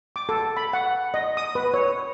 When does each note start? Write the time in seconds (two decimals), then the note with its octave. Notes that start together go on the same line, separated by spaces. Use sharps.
0.16 D6
0.29 A4
0.57 B5
0.73 F#5
1.14 D#5
1.37 D#6
1.55 B4
1.74 C#5